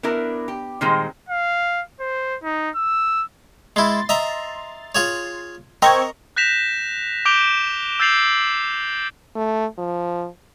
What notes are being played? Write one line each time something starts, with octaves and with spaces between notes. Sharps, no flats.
B3 D4 E4 A#4
G4
A#2 D#3 G3 G#3 C4
F5
C5
D#4
E6
G#3 E4 C6 A6
D#5 E5 A#5
F4 G#4 C#5
C4 A#4 D#5 C#6 G#6
F#6 G6 A#6 B6 E7 F7
D6 G6 D7 F7 G7
E6 G6 A6 C7 F7 F#7
A3
F3